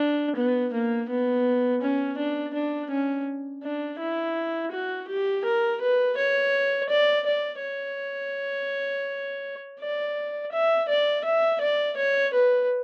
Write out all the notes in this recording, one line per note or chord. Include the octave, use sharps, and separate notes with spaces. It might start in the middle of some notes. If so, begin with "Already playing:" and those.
Already playing: D4
B3
A#3
B3
C#4
D4
D4
C#4
D4
E4
F#4
G4
A#4
B4
C#5
D5
D5
C#5
D5
E5
D5
E5
D5
C#5
B4